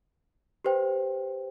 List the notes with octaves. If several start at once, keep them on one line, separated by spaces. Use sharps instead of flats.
G4 B4 C5 G5